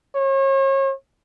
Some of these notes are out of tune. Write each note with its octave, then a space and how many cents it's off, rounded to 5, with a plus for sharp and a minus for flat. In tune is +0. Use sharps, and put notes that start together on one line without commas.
C#5 -35